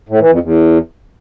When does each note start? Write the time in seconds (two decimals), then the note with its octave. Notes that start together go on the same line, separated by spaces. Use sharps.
0.09 A2
0.20 E3
0.31 F2
0.42 E2